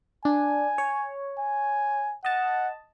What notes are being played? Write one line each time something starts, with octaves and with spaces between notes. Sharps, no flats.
D4 G#5
C#5
G#5
D#5 F#5 A5